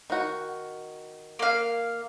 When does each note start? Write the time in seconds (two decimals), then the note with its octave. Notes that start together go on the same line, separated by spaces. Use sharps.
0.10 D#3 F#4
1.39 A#3 F5